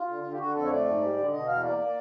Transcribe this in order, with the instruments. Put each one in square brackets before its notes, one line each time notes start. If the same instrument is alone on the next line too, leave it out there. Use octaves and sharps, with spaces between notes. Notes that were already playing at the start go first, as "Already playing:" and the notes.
Already playing: [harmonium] F4
D3
D3
G4
D3 F#4
F2 A4
C#5
A3 D5
G#2
G3
D3
B2 D#5
E2 F5
A#3 D5
A#3